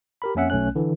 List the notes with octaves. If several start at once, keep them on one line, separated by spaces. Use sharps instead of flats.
G4 A#4 B5
F2 A#3 C#4 E5 F#5
B1 A3 C#4 F#6
D3 E3